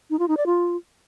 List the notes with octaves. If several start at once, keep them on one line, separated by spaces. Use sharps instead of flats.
D#4
F4
D#4
D5
F4